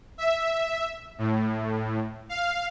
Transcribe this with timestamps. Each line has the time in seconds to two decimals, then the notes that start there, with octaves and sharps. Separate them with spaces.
0.18 E5
1.18 A2
2.29 F5